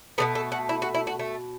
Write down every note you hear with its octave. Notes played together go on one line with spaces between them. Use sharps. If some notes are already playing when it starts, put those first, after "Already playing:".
B2 F#3 A3 B3
A4
F#4
E4
F#4
E4
F#4
A3